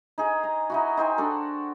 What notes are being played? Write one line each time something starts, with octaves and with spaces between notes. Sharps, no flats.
D#4 G#4
A#5
D#4 E4 F#4
D#4 C5 G5 G#5
D4 F#4 A4